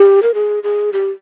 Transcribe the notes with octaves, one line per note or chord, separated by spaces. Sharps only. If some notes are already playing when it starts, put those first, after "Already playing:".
Already playing: G4
A#4
G#4
G#4
G4